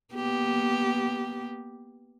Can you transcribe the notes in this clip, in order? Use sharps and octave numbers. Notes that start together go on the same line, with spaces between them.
A#3 B3 G4